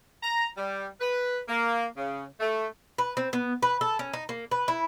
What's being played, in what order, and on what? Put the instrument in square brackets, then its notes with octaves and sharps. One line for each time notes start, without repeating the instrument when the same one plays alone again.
[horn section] A#5
G3
B4
A#3
C#3
A3
[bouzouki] B4
C4
B3
B4
A4
C#4
D#4
A#3
B4
E4